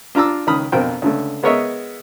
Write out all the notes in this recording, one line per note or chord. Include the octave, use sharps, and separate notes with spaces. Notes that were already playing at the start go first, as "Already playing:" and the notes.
D4 F4 A#5 D6 E6
C#2 D#3 B5 D#6 F6
A#1 F2 B2 A#4 C5 G5
C#2 D3 A3
G#3 B3 A#4 C#5 D#5 E5